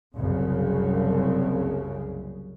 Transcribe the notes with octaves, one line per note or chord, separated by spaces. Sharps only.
F#1 C2 C#3